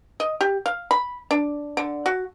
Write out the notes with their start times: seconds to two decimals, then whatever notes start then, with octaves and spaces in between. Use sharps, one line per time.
0.20 D#5
0.41 G4
0.66 F5
0.91 B5
1.31 D4
1.77 D3
2.06 F#4